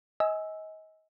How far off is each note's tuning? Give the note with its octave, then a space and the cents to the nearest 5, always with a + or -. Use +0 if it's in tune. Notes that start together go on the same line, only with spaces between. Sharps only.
D#5 +30 G#5 +0 E6 -5